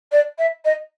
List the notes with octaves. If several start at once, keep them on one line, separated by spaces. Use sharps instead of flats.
D5
E5
D#5